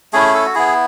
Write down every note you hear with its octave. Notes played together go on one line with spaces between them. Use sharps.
A3 C#4 E4 G#4
A4
F#4
B3 E4 G#4